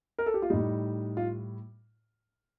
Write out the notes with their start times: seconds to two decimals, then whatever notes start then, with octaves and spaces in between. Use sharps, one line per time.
0.18 A#4
0.26 A4
0.34 G4
0.42 F4
0.50 A2 G3 D#4
1.17 F4